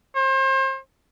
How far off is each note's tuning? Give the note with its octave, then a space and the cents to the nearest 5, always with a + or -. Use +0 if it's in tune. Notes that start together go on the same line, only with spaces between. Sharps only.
C5 +35